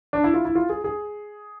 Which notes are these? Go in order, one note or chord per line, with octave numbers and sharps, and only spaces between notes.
D4
E4
F4
E4
F4
G#4
G#4